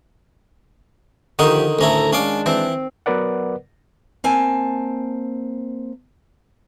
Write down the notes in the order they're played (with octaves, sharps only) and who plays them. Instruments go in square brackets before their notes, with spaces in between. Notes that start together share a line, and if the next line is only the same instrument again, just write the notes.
[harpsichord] D3 D#4 F#4 [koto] D#3 [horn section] F3 G4
[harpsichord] D2 C#4 E4 [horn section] A2 A4 A#5
[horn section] G#3 D4 [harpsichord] C#4 F5 D6
[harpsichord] E3 [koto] C4
[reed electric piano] F#3 B3 A#4 B4 D5 F#5
[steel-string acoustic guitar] A#3 C4 G#5 A5